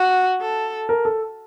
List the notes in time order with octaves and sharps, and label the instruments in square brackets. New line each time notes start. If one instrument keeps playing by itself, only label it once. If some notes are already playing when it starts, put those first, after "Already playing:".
Already playing: [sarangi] F#4
A4
[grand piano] A#4
A4